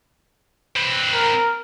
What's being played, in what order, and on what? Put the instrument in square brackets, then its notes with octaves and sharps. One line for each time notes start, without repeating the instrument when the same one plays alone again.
[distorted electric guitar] C4 B4
[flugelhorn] A#4